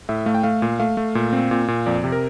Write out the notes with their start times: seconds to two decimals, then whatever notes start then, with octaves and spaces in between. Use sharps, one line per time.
0.09 A2 E5
0.26 A3 F5
0.35 G5
0.43 A3 F5
0.62 A#2
0.79 A3 F5
0.97 A3
1.15 A#2
1.33 C4
1.51 A#2
1.68 A#2
1.86 F2 D5
2.04 C3
2.12 A#4